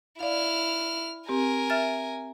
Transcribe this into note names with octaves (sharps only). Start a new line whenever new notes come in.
E4 D5 F5 F6
C4 G4 A#4 G#5
E5 F6 A6